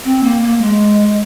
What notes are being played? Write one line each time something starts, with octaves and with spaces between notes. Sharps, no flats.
C4
A#3
A#3
G#3